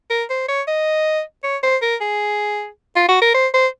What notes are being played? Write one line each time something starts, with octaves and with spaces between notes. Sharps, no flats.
A#4
C5
C#5
D#5
C#5
C5
A#4
G#4
F4
F#4
A#4
C5
C5